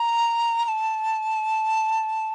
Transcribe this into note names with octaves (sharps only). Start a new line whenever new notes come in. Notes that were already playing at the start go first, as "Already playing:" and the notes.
Already playing: A#5
A#5
A5